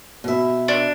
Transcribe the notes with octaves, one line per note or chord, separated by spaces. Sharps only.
B2 E5
D4